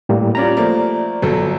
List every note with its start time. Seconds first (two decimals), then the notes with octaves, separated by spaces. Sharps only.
0.09 A2 G3 A#3
0.35 G3 C#4 F4 D5 A#5
0.57 F3 A3 A#3
1.22 G1 F#3 A4